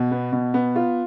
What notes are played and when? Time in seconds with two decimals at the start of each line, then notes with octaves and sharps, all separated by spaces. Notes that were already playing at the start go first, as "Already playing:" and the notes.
Already playing: B2
0.11 B3
0.33 B2
0.54 B3
0.76 F4